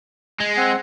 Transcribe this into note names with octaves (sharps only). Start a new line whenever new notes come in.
G#3
C4 F#5